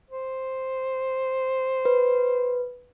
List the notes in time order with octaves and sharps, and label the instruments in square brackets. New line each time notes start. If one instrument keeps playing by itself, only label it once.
[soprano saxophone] C5
[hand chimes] B4